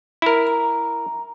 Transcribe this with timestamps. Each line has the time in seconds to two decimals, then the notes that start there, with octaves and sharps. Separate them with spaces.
0.22 E4 A#4
0.47 A#5